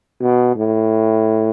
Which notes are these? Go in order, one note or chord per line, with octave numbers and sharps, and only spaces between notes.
B2
A2